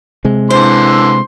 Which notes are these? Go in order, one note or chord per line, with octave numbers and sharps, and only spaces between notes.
C3 G#3
D3 E3 C5 C6